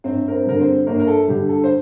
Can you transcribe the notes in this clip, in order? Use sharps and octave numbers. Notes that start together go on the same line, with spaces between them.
G1 C4 C5
A#4
C4 C5
G2 D3 A#4
C4 C5
G1 A#3 A#4
A#4
A4
G2 D3 G4
A4
C5